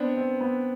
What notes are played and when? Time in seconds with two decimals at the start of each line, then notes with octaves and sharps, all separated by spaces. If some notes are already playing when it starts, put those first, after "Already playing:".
Already playing: B3 C4 D4
0.17 C4
0.41 B3